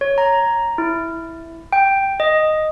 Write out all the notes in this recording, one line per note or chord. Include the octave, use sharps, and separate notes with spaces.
C#5
A#5
E4
G5
D#5